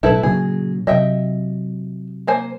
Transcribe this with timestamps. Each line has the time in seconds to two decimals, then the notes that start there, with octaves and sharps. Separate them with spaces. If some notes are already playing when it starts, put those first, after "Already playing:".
0.03 B1 A2 E4 A4 B4
0.23 A#2 C#3 F#3 G#4
0.87 C3 F#3 D#5 E5 G5
2.27 A#3 C5 G#5